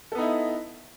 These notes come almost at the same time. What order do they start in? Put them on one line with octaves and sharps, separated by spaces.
A4 B3 D#4 E4